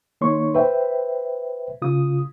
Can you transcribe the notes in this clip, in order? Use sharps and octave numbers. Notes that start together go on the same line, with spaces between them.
D#3 A#3 D#4 C#5 C6 C#6
B4 C5 E5 G5
C#3 F4 D#6